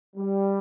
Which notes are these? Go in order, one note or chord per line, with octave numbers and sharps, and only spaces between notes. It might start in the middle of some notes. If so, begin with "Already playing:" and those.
G3